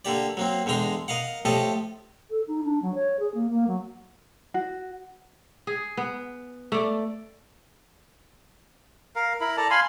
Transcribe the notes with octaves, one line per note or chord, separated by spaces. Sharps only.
D3 A#3 G4 D5
F#3 A#3 C4
E2 D3 G#3 G5 A#5 C6
A#4 D#5 F5 F#5
A2 F3 G4 A4 D#5 A5
A4
D#4
D4
F#3
C#5
G#4
A#3
A#3
F#3
F#4
G#4
B3
A3 D5
A#4 F5
E4 A#4 B5
A4 D5 A5 A#5
F5 G#5 B5 C6